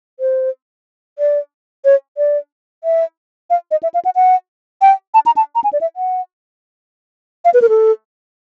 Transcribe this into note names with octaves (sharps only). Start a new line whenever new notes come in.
C5
D5
C#5
D5
E5
F5
D#5
E5
F5
F#5
F#5
G5
A5
A#5
A5
A#5
G#5
D5
E5
F#5
F5
B4
A#4
A4